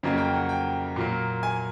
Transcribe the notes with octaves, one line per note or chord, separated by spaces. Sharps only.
F2 C#3 F#3 A#3 C#4
G5
F#5
G5
A#2 F#3 A#3
G#5